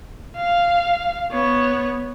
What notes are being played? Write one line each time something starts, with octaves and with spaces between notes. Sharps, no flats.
F5
B3 C#5